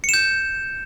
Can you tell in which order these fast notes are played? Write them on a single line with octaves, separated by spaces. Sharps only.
C#7 E7 G6